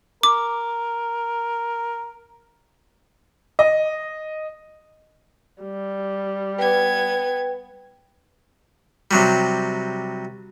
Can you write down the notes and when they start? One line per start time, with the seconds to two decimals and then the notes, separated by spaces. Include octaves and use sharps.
0.23 A#4 D6
3.59 D#5
5.62 G3
6.58 B3 B4 G5 G#6
9.11 C3 F#3 G3